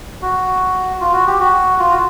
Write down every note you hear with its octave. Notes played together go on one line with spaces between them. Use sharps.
F#4
F4
F#4
G4
F#4
F4
F#4